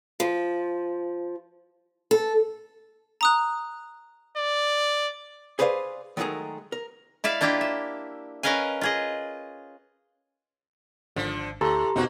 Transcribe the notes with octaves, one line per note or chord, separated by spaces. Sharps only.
F3
A4
A#5 D#6 F#6
D5
G#4 B4 C5 D5 F5
D#3 F#3 G#3 A3 G#4 A#4
A#4
E4 D5 E5 F5
A#3 D4 E4 F4 G4
E5
C#4 A#4 B4 D#5 F5 G#5
F4 G#4 D#5
G#1 D3 F3
D2 A2 G4 A4 A#5 C6
E1 B2 A#3 C4 D#4 F#4